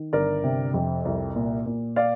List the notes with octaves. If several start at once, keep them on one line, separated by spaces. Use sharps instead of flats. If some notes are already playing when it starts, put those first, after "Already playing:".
Already playing: D#3
G1 A#4 D5
C3
F2
C2
A#2
A#2
D5 F5